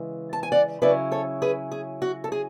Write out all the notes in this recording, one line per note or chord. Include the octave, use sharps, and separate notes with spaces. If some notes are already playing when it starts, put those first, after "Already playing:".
Already playing: C#3 E3 G#3
A5
G#5
D5 F#5
C#3 F#3 C#4 E4 B4 D5
A4 C#5
G#4 B4
G#4
F#4
A4
G#4